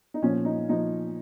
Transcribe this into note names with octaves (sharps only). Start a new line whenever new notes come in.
D#4
A#2 F3 C#4
D#4
A#2 F3 D#4